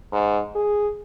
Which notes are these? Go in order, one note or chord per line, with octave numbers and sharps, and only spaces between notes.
G#2
G#4